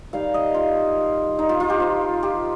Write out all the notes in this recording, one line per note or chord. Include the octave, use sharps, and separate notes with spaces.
D#3 G3 D#4 F5
D#5
F4
D#4
F4
F4
G4
F3 D#4
G4